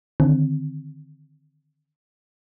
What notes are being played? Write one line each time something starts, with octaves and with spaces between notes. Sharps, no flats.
D3 D#3 C4